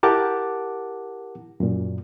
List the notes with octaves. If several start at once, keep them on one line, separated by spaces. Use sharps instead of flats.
E4 G4 A#4 F#5 A5 D6
F#2 A#2